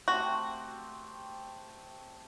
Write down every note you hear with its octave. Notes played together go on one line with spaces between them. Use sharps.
A3 C4 F#4 G4